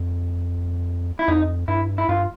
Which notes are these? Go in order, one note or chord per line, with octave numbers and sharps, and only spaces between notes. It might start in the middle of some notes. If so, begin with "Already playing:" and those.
Already playing: F2
E4
F2 D#4
G2 E4
E4
G2 F4